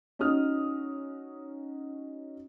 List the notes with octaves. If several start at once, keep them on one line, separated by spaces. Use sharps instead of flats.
C#4 D#4 F#4 D#6 F6